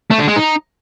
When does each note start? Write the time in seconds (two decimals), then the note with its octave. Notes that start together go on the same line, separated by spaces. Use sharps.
0.11 A3
0.19 D3
0.28 G#3
0.36 D#4